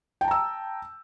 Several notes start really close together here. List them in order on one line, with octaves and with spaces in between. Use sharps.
G5 A5 A#5 E6